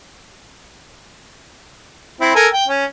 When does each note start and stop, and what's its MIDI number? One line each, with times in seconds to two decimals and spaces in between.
2.21 2.31 60
2.21 2.31 64
2.35 2.48 69
2.35 2.48 70
2.35 2.48 80
2.53 2.65 79
2.68 2.85 61